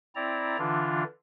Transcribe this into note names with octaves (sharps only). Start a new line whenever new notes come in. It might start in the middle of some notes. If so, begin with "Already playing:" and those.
C4 E4 D5 A#5
D3 E3 D4 F4